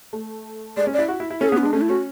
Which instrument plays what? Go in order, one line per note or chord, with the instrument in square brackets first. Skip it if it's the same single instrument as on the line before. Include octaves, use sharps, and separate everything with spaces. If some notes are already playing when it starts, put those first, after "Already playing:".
[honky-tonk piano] A3
[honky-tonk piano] G#3 [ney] D5
[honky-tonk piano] C#4
[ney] D5
[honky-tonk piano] E4
F#4
E4
E4
[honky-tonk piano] C#4 [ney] A4
[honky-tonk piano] B3 [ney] G#4
[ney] C#4
[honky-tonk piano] G#3 [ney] D4
[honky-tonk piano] A3 [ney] C#4
[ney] E4
[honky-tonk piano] C#4 [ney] F#4